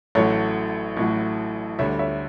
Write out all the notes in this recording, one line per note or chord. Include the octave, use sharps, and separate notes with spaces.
A1 A2 F#3 A4 C#5
A1 A2 F#3
D2 D3 G3 C#5 E5
C#5 E5